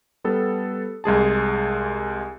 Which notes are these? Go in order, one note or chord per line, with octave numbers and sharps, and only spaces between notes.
G3 B3 A4
C2 G#3 G#4 A5